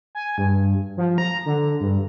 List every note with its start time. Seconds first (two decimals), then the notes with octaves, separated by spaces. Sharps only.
0.15 G#5
0.38 G2
0.97 F3
1.18 A#5
1.46 D3
1.80 G2